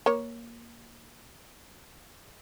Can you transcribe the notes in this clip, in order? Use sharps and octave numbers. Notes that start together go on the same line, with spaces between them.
A#3 C#5